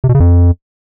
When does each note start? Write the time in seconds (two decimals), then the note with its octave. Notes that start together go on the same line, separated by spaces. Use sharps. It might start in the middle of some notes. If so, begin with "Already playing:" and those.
0.04 C3
0.09 B2
0.15 C#3
0.20 F2